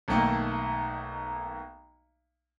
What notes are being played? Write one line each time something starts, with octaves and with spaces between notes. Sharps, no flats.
B1 D#3 A3 A#3